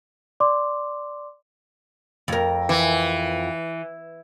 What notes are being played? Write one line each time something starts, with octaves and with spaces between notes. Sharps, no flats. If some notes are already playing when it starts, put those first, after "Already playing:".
D5 C6 D6
F2 A#4
E3